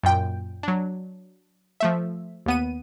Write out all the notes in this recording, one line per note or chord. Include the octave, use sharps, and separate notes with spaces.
F#2 A#2 G5
F#3 D4
F3 A3 E5
D#2 B3 D#7